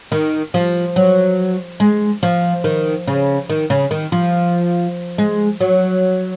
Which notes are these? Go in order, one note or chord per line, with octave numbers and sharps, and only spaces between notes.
D#3
F3
F#3
G#3
F3
D#3
C#3
D#3
C#3
D#3
F3
G#3
F#3